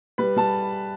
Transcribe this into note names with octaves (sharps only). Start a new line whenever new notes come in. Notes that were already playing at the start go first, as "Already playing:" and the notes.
G3 B4
G3 A5